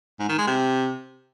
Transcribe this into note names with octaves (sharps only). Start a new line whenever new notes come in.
G#2
D#3
G#3
C3